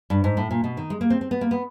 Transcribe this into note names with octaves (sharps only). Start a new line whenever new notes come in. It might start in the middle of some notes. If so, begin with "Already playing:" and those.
G2
G#2
A2
A#2
B2
D#3
G#3
A#3
C4
C4
B3
A#3
B3